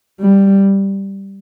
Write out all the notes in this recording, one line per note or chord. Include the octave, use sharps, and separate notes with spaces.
G3